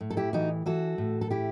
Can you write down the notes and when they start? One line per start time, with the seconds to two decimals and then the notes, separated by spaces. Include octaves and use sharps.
0.01 A2
0.10 A4
0.17 E4 G4
0.33 E3 D#4 F#4
0.66 E3 F#4 A4
0.98 A2
1.21 A4
1.31 E4 G4